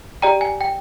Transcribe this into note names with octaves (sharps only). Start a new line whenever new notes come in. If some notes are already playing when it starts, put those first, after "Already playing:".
G4 D5 G5 A#5
G#5
G5